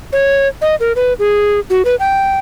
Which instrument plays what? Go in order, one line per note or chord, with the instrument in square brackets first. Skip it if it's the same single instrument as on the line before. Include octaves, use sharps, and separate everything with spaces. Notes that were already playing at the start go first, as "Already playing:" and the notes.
[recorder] C#5
D#5
A#4
B4
G#4
F#4
B4
G5